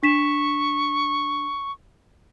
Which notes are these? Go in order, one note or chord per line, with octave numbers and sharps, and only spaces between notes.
D4 C#6 B6 E7